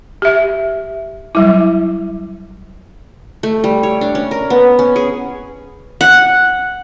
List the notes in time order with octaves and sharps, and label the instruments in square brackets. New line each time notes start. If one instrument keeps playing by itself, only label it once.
[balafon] G4 E5
F#3 G3 E4
[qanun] A3
G3
C#5
D4
C#4
A#4
B3
C#4
G#4
F#5